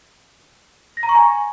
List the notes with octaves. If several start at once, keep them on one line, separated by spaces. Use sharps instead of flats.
A#6
A#5
C#6
G#5